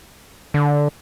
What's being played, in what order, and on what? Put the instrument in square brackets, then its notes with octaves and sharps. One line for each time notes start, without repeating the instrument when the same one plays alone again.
[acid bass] D3